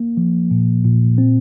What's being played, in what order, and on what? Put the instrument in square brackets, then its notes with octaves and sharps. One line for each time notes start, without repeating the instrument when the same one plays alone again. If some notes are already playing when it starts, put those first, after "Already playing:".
Already playing: [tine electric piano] A#3
F3
A#2
A#2
C4